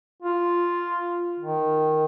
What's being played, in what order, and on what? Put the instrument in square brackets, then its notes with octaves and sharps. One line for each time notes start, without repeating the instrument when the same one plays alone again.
[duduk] F4
D#3